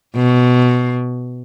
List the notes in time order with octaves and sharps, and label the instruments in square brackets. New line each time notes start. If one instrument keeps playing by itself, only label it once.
[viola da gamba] B2